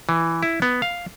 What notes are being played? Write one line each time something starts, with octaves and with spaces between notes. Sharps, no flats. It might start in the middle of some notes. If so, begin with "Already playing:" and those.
E3
E4
B3
F5